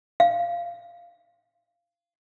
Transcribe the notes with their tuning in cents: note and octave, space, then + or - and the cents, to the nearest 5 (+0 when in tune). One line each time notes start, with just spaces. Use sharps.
F5 -15